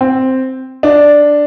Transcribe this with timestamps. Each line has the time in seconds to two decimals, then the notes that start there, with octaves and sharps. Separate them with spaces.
0.01 C4
0.83 D4